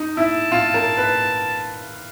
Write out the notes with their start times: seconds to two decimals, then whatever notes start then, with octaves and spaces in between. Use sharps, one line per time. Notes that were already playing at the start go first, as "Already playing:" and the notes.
Already playing: D#4
0.17 E4 A5
0.52 F4
0.74 A#4
0.97 B4